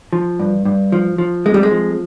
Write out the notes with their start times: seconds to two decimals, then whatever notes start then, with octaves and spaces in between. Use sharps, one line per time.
0.13 F3
0.39 G2
0.65 G2
0.92 F3
1.18 F3
1.46 F2 G#3
1.54 G3
1.63 G#3
1.71 F3